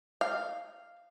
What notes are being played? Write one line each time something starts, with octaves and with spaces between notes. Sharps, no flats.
F5